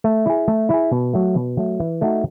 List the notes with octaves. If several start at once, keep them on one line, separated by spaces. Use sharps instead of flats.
A3
E4 G#4
A3
E4 G#4
B2
F#3 A3
B2
F#3 A3
E3
A3 D#4 F#4